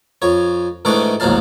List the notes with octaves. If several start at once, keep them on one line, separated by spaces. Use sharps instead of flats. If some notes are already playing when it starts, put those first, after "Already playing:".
F2 C#5
G#2 D#3 E3 A3 D4 C#6
A1 D#2 G#2 F#3 F5 A5